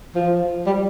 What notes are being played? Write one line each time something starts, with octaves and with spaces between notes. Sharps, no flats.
F3
G3